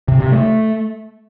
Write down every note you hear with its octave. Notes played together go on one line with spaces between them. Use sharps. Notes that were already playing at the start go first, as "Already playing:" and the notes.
C3
C3
A3